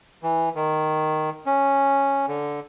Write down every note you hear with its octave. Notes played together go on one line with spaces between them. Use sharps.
E3
D#3
C#4
D3